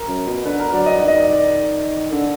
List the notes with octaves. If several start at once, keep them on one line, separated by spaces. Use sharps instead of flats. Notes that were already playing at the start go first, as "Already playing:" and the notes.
Already playing: A#4
F#2
B2
D3 B4
A#4
F#3 D5
D#5
D#3 D5
D#5
D5
D5
D3